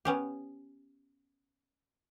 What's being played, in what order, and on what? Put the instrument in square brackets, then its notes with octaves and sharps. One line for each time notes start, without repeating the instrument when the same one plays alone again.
[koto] B3 C#4 G4